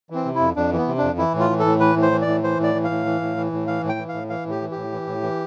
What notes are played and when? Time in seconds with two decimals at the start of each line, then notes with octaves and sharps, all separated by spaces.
0.10 E3 C4
0.25 C3
0.35 E4
0.40 F2
0.56 F2 D4
0.72 E3 B3
0.87 C3
0.98 F2 D4
1.18 E3 E4
1.34 A2
1.40 F4
1.50 E3
1.59 A4
1.66 A2
1.80 E3 B4
1.96 A2
2.02 C5
2.12 E3
2.22 D5
2.27 A2
2.44 E3 C5
2.59 A2 D5
2.74 E3
2.84 F5
2.90 A2
3.06 E3
3.21 A2
3.37 E3
3.52 A2
3.67 E3 F5
3.83 A2
3.89 G5
3.98 E3
4.09 F5
4.14 A2
4.30 E3 F5
4.46 A2
4.51 G4
4.62 E3
4.71 A2 G4
4.93 E3
5.07 A2
5.23 E3